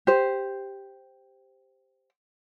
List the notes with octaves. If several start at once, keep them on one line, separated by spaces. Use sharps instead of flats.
G4 C5